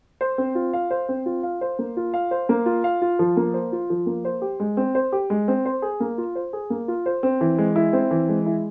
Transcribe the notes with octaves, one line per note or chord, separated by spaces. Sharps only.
C5
C4
F4
F5
C5
C4
F4
F5
C5
A#3
F4
F5
C5
A#3
F4
F5
F4
F3
A#3
C5
F4
F3
A#3
C5
G4
G#3
C4
C5
G4
G#3
C4
C5
G#4
A#3
F4
C5
G#4
A#3
F4
C5
C4
E3
G#3
E4
C4
E3
G#3
E4